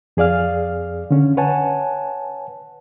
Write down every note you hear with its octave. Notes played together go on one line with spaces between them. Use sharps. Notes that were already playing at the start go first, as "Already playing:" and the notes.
F2 G#4 D5 F5 F6
D3 C#4
B4 C#5 F#5 G#5 A5